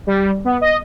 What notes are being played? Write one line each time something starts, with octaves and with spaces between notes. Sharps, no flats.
G3
B3
D#5